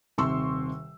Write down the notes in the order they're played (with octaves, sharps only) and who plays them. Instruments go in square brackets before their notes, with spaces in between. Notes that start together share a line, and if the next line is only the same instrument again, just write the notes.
[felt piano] D#1 C3 C6 C#6 E6